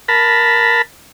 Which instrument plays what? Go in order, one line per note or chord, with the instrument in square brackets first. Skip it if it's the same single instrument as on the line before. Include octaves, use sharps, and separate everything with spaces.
[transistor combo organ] A#4 A5 B5